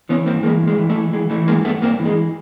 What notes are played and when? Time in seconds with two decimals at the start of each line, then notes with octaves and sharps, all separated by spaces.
0.09 E3 B3 C#4
0.26 G2 A#3 C4
0.43 E3 G#3 A#3
0.62 G2
0.68 G#3
0.78 E3
0.90 A3
0.95 E3
1.13 E3 G#3
1.30 E3 A3
1.47 G2 G#3 A#3
1.64 G2 A3 B3
1.82 G2 A#3 C4
1.99 E3
2.05 G#3